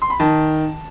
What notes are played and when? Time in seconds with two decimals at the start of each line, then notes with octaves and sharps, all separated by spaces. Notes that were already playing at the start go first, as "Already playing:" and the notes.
0.02 C6
0.10 B5
0.20 D#3 A5